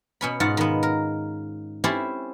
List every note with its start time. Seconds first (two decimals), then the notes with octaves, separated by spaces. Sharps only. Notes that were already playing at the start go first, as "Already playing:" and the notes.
0.21 B2 C#4 B5
0.40 G#2 F4 F#5
0.57 D#3 B3
0.83 A#4
1.84 C4 C#4 E4 G4 A4 C5